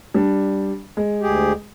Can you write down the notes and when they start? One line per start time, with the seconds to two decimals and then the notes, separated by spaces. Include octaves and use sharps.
0.14 G3 D4
0.97 G#3
1.21 D2 G4 G#4